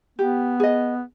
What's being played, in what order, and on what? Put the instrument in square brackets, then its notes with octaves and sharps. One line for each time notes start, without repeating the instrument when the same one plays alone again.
[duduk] B3 [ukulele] G4
[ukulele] G#4 D#5